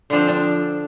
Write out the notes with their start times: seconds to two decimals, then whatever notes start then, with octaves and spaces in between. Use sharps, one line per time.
0.10 D3 F3 C4 D4
0.28 D4